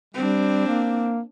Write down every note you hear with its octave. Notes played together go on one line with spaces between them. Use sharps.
G3 C4 D4
A#3